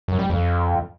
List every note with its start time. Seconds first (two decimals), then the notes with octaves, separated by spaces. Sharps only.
0.08 F#2
0.19 G3
0.30 F2